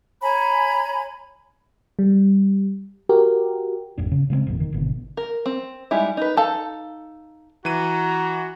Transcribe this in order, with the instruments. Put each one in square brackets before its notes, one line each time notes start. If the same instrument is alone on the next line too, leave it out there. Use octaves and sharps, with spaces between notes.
[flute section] C#5 G#5 A#5 B5
[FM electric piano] G3
F#4 G4 A#4
[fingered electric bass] G#1 F2 D4
C#3
C#3 G#3 B3 C4
F#1 E2 A#2
D#3
G#1 B2 D3
[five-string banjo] A#4
C4
G3 G#3 D#4 E4
D#4 B4
D#4 A4 F5
[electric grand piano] E3 D#7 [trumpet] F#4 [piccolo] A#5